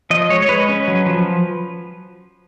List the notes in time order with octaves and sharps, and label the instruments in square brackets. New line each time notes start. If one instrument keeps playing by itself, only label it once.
[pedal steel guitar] F3 D#5
G#3 C#5
C#5
G#3 B4
C#4
F#3
F3